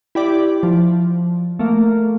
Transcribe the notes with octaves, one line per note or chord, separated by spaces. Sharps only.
E4 G4 D5
F3
A3 A#3